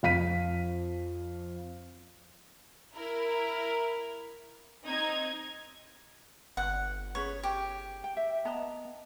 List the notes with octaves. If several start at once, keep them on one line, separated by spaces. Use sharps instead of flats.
F2 F5 B6 D#7
E4 A#4
C4 D#4 G#6
G1 F#5
C#4 G#4 B4 C#5
G4
G5
E5
B3 D#5 A5 A#5